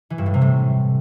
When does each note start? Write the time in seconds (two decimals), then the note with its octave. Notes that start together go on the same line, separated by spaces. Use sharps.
0.10 E3
0.18 G2
0.26 A2
0.34 C3
0.41 A2